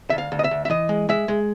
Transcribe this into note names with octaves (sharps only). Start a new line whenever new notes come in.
D2 E5
F5
D2
D#5
E5
D2
E5
E3 D#5
G#3
G#3 E5
G#3